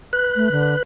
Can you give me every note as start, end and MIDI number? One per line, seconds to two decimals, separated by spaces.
0.13 0.83 71
0.13 0.83 90
0.36 0.48 57
0.51 0.75 50